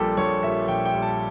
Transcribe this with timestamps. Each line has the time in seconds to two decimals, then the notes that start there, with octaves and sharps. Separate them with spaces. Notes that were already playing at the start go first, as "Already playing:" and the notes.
Already playing: A#1 A#2 G3 G4 A4
0.17 A#1 C#5
0.43 A#2 G3 E5
0.68 A#1 G5
0.85 G5
0.93 A#2 G3
1.02 A5